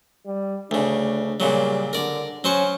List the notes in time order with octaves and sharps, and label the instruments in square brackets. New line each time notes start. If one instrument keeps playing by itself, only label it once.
[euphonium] G3
[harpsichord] D2 C#3 [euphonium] D4
[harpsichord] A#2 C#3 F#3 [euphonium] G3
[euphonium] D3 [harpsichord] A#4 D5
[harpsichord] F#3 C5 C#6 [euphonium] C#4